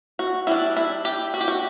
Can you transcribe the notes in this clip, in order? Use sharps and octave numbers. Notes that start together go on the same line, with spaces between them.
F#4
G3 D4 E4
E4
G4
F#4
G4
F#4